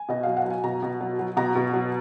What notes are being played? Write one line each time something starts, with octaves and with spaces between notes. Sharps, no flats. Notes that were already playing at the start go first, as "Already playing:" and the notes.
Already playing: G#5
B2 D#5
F#3 F5
F#5
F#3 G#5
B2 A#5
B2
F#3
F#3
B2 A#5
B2
F#3